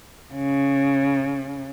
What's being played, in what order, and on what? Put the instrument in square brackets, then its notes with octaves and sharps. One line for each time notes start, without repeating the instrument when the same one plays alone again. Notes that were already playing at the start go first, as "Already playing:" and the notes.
[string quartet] C#3